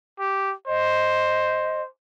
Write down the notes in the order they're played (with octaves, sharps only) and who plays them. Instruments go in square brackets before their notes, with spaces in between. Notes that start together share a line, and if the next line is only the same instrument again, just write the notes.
[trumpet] G4
[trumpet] C5 [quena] D#5